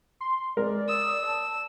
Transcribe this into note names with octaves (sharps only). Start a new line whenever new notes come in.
C6
G#3 A#4 D5
D#6 E6
A5